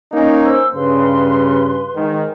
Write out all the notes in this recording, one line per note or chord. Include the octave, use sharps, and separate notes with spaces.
A#3 C#4 D#4
C5 E6
G2 C#3 B4 C6
G#2 D#3